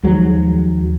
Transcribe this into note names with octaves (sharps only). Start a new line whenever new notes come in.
D#2 F3 F#3 G#3